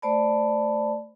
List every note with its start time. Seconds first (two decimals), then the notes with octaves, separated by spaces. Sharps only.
0.02 A3 C5 D5 A5 B5